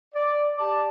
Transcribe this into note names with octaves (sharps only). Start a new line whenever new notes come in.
D5
G4 D5 A5